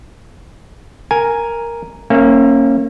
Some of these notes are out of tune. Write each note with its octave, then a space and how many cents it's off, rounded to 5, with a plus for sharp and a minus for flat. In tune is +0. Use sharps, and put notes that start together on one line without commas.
A#4 +0 G#5 +0
A#3 -15 C#4 -25 E5 +20